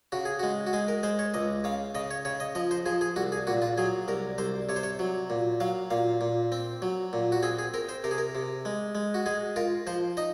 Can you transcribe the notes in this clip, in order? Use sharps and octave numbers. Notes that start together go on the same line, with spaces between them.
C#3 F#4
G#4
G#3 F#4
F#4
G#3 G#4
A#4
G#3 C5
C#5
C#2 D#5
C#3 F5
C#3 D#5
C#5
C#3 C#5
D#5
F3 D#5
C5
F3 G#4
G#4
C2 F#4
G#4
A#2 F#4
F4
F#3 G#4
C2 A#4
C2 C5
C3 C#5
C5
C#5
F#3
A#2
F#3 F5
A#2 F5
A#2
C4
F#3
A#2
F#4
C4 G#4
G#4
C4 A#4
C5
C3 A#4
G#4
A#4
C3
G#3
G#3
F#4
G#3 G#4
F4 A#4
F3 C5
D#4 D#5